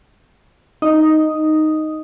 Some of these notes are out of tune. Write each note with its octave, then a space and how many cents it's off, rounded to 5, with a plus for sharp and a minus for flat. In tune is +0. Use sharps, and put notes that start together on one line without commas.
D#4 +0 D#6 +0